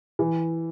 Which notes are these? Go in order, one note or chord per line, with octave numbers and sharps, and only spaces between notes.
E3